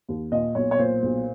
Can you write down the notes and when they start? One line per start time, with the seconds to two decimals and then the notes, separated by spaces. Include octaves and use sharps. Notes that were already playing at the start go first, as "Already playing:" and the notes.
0.08 D#2
0.32 A#2 D#5
0.55 B1 C#5
0.71 C#5
0.79 A#2 C5
1.03 B1